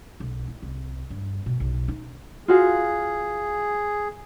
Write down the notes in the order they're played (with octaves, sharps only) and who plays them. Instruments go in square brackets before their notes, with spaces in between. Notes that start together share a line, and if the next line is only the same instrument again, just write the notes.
[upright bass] B1
E4
C2
G2
B2
B1
D#4
[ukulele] F4 F#4 F5 [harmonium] G#4